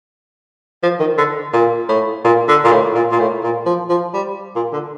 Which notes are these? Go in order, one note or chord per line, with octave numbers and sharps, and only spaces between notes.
F3
D#3
D3
A#2
A2
A#2
D3
A#2
A2
A#2
A#2
A2
A#2
F3
F3
G3
A#2
D3